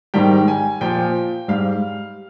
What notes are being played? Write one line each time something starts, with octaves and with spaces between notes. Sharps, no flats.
G#2 D#3 G3 G5
G#5
A#2 F3 G5
G#2 G3 F5